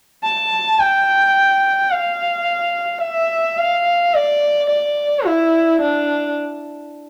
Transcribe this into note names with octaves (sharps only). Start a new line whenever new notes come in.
A5
G5
F5
E5
F5
D5
D5
E4
D4